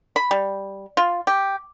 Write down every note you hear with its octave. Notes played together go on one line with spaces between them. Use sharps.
B5
G3
F4
G4